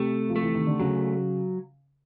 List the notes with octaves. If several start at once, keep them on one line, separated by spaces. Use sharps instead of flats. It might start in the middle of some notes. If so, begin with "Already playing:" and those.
Already playing: C3 A3
F3
A3
E3
D#3
D3
C#3 F#3